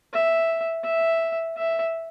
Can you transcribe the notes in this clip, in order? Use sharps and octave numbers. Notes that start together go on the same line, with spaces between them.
E5
E5
E5